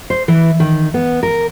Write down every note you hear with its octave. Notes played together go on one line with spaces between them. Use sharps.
C5
E3
D#3
B3
A#4